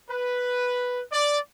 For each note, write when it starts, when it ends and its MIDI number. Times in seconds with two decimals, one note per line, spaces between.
0.10 1.01 71
1.12 1.38 74